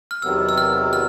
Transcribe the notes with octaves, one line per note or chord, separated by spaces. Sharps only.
F6
E2 C3 D#3 F#3 B3 E6
E6
F6
F6